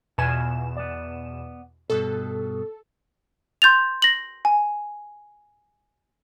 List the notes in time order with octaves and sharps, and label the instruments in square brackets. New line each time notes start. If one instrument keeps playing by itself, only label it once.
[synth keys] E2 B2 E7 [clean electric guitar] F4 G#5
[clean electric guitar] B3 D5
[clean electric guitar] G2 B2 [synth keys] A4
[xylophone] C6 G6 A6 F7
A#6 F#7
G#5